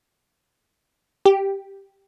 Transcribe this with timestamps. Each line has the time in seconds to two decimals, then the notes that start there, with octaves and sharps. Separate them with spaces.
1.25 G4